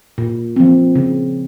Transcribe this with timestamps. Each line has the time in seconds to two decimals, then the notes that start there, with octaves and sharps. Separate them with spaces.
0.18 A#2
0.56 F3 C4
0.95 C#3